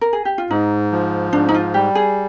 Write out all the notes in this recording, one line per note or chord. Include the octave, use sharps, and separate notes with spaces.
A#4
G#4
G4
F4
G#2 D#4
F3
G#2 D4
D#4
F4
G3 G4
G#4